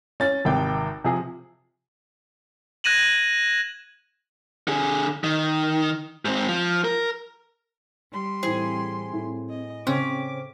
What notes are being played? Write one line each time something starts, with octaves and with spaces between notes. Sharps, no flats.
C#4 A6
G#1 C3 G5
C3 F3 G#4
F#6 G#6 A#6 D#7 E7 F#7
D3 G#4
D#3
G#2 C4
F3
A#4
G3 C6
A2 E3 C4 G#4
A2
D#5
C#3 C4 C#4 D6